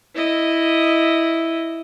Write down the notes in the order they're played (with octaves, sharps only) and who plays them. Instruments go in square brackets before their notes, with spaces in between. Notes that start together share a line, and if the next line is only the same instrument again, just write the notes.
[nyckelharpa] E4 D#5